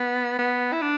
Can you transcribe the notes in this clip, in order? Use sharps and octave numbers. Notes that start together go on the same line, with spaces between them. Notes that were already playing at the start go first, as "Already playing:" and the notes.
Already playing: B3
B3
E4
D4